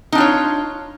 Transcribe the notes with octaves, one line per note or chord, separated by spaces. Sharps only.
D4 D#4 F4 C#5